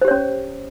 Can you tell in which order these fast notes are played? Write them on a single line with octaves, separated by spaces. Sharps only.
C5 G4 C#5 C#4